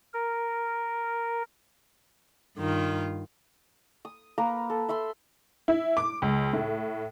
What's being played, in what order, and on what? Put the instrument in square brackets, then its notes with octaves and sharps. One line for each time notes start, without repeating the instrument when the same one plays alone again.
[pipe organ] A#4
[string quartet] G2 D#3 F4
[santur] D#6
A#3 A#4 B4 A#5
A4
A4 E5 B5 C6
[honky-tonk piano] E4
D6
C#2
A2